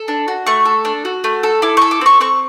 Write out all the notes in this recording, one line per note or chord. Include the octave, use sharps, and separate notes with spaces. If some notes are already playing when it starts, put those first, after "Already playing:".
Already playing: A4
D4
F#4
A3 C#6
A4
D4
F#4
A3
A4
E4 D6
A4 C#6
D6
C4 C#6
C4 C#6